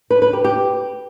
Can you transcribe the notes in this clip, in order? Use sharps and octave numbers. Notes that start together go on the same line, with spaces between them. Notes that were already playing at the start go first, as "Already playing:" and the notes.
B4
B4
G4
G4